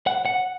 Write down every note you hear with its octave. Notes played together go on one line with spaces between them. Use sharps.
F#5
F#5